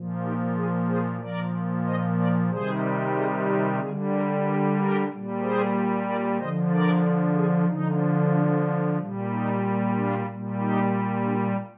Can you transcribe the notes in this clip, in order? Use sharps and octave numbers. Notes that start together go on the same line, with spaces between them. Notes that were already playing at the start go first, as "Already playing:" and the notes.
Already playing: A#2 F3
D#4 G4
F4 G#4
G#4 C5
A#2 F3 A#4 D5
C5 D#5
A#4 D5
C3 D#3 G3 G#4 C5
G#4 C5
G4 A#4
D3 G3 F4 G#4
G4 A#4
G4 A#4
G4 A#4
A#2 G3
G#4 C5
A#4 D5
D3 F3 C5 D#5
A#4 D5
F4 G#4
D3 F3 D#4
D4 F4
A#2 G3
D#4
D4 F4
A#2 G3
D#4 G4
D4 F4